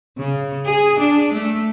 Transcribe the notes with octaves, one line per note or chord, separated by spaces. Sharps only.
C#3
G#4
D4
A3